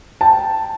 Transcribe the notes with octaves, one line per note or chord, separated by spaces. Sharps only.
G5 A5